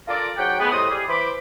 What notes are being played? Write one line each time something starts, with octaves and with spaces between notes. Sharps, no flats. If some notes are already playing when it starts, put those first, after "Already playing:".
F4 A4 A#4 D5
G#2 F#3 G4 F#5 G5
G#3 A3 B3
A2 G3 C5 D#5 D#6
G3 G#4
E3 C5 B5 D6